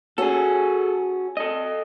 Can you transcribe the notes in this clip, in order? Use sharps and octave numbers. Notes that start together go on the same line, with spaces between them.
C#4 F#4 G#4 A4
A4 D#5